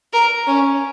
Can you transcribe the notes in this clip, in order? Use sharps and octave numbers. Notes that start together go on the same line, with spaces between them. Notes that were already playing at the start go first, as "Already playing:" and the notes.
A#4
C#4